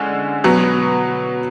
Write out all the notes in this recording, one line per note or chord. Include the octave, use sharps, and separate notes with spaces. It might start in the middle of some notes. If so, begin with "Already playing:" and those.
Already playing: D3 G#3 C#4
B2 F#3 B3